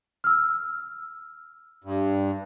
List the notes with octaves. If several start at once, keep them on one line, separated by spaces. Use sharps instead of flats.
E6 F6
G2